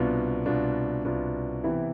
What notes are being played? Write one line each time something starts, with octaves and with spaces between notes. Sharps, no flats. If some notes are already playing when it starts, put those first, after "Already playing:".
Already playing: C2 B2 B3 D4 F4
C2 B2 B3 D4 F4
C2 B2 B3 D4 F4
C3 E3 B3 E4